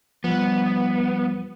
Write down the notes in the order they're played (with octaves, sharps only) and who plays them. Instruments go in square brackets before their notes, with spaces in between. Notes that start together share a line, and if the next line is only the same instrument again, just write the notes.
[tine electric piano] F3 G3 [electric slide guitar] B3